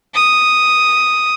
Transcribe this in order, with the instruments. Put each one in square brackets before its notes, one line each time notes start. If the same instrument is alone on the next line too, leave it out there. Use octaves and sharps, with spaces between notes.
[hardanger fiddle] D#6